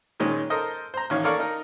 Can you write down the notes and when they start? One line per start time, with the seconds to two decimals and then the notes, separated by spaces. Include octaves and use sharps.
0.20 A#2 D#3 G#3 C#4
0.50 A4 A#4 C5 D#5
0.94 C5 A#5
1.10 A1 D#3 C#5 F5
1.24 A4 A#4 C#5 D5 F5 C#6
1.39 D#4 A#4